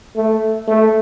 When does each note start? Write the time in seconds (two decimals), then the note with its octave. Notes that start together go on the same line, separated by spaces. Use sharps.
0.16 A3
0.67 A3